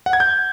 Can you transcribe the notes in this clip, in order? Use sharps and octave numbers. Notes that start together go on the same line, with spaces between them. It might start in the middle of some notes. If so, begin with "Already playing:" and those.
F#5
G#6
G6